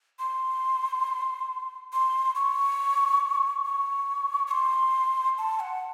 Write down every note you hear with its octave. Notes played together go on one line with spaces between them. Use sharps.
C6
C6
C#6
C#6
C#6
C6
A5
F#5